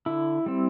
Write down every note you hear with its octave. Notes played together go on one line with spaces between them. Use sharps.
D3 E4
G3 C4